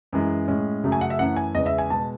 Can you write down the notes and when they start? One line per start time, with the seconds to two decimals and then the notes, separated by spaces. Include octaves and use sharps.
0.13 F#2 E3 G#3
0.48 A2 G#3 C#4
0.84 F#2 C#3 F#3 A3
0.92 G#5
1.01 F#5
1.10 E5
1.19 F#2 E3 A3 C#4 F#5
1.37 G#5
1.55 E2 C#3 G#3 B3 D#5
1.66 E5
1.78 G#5
1.90 B2 G#3 B3 A5